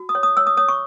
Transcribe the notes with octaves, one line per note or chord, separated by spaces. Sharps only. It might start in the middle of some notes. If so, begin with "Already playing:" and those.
Already playing: F#4
D#6
C#5
D#6
C#5 E6
D#6
C#5 D#6
C#6